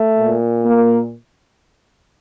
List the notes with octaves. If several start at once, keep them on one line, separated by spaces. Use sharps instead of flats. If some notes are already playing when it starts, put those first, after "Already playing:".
Already playing: A3
A#2
A#3